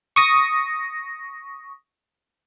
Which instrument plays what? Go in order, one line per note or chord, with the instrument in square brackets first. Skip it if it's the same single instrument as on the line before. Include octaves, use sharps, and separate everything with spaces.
[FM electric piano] C#6 D#6 A#6